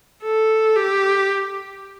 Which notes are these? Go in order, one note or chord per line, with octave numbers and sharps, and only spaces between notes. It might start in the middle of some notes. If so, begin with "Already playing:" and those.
A4
G4